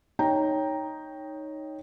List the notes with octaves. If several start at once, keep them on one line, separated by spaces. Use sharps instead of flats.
D#4 C#5 G5 A#5